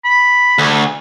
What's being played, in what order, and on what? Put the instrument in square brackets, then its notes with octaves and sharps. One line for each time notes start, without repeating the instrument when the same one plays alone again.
[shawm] B5
[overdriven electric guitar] D2